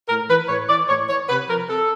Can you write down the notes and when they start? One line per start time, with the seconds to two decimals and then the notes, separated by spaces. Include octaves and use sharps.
0.08 A2 A#4
0.29 E3 B4
0.49 A2 C#5
0.69 E3 D5
0.89 A2 C#5
1.09 E3 C#5
1.29 C3 B4
1.49 F3 A#4
1.69 C3 A4